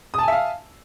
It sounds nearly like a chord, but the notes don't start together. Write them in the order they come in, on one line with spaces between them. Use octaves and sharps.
D#6 A5 G#5 E5 F5